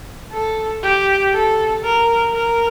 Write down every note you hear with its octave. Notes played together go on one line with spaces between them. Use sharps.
A4
G4
A4
A#4
A#4